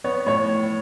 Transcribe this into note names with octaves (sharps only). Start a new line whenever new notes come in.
B3 C#5
A2 C#5